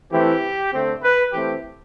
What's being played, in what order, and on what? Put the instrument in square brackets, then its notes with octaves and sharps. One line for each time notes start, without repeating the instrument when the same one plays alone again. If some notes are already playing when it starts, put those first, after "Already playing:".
[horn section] E3 A3 C4 G4
D3 A3 C4
B4
E3 A3 C4 G4